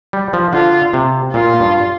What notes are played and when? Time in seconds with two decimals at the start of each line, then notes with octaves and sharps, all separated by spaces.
0.13 G3
0.33 F3
0.53 D3 F4
0.93 C3
1.33 A#2 F4
1.60 G2